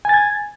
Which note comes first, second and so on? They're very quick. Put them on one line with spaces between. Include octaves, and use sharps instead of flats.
G#5 A6 G#6